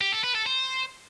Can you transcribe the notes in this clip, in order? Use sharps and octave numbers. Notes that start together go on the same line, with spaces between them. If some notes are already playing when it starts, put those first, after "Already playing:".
G4
A4
B4
A4
C5